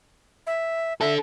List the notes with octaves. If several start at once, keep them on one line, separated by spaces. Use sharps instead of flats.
E5
D4 A4 E5